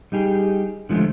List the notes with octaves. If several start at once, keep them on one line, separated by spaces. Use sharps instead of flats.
G3 D#4 G4 G#4
D3 F3 G#3 A3 C5